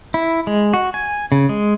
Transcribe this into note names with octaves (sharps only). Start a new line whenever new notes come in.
E4
G#3
F#4
G#5
C#3
G#3